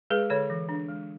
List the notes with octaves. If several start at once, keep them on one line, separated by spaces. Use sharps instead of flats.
G#3 G#4 B4
D3 A4 C#5
E3
D4
G#3